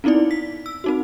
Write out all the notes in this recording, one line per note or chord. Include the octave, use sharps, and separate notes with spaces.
B3 C4 D#4 E4 D5
B6
E6
C4 D#4 F#4